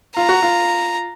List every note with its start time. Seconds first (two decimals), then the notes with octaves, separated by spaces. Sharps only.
0.17 F4 A#5
0.29 F#4
0.42 F4